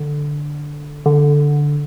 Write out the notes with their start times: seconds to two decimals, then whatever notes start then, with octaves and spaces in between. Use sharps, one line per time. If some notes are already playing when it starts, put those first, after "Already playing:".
Already playing: D3
1.06 D3